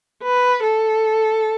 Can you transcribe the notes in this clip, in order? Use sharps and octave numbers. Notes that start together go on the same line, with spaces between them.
B4
A4